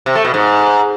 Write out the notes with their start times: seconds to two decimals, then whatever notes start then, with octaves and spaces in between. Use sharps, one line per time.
0.06 C3
0.15 A3
0.25 B2
0.34 G#2